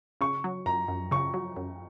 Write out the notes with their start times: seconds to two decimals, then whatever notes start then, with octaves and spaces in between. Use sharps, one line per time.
0.21 C#3 C#6
0.44 F#3
0.66 F#2 A#5
0.88 F#2
1.11 C#3 C#6
1.34 F#3
1.57 F#2